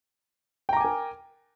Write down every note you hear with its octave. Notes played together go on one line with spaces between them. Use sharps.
A#4 G5 G#5 A#5 D6